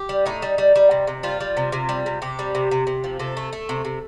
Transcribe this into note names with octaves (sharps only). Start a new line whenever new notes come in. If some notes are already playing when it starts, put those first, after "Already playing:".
Already playing: G4
G3
A2 D#4
G3
G3
G3
C3
C3
G3 F4
G3
C3
C3
G3
C3
C3 G4
G3
C3
C3
C3
F3
C3 A4
A3
A3
C3
C3